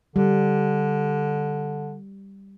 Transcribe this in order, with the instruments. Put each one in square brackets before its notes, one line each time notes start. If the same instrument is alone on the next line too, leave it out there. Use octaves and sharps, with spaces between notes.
[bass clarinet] D3 [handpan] G3